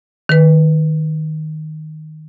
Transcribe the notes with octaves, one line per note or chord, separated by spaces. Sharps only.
D#3 B4